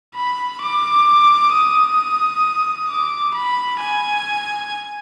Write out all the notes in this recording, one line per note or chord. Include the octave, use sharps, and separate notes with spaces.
B5
D6
D#6
D6
B5
G#5